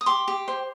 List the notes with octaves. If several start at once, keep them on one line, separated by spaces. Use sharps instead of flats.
D#6
G4 C6 D6
G4
C5